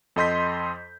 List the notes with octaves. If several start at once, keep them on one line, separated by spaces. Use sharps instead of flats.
F2 A4 D#5 C6 G6 B6